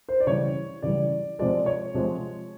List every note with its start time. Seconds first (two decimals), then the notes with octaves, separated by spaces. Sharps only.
0.08 C5
0.20 D5
0.27 C#3 E3 G3 C#5
0.82 C#3 E3 G3 D5
1.39 C3 F3 G#3 D5
1.66 C#5
1.94 C3 F3 G#3